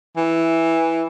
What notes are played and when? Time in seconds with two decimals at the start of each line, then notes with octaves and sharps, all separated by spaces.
0.17 E3